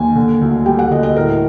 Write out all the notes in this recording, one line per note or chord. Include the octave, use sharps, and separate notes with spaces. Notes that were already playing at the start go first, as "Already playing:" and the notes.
Already playing: D#2 G#5
D3
D2
G3 G5
F#5
D2 D#5
D#5
A2 A#4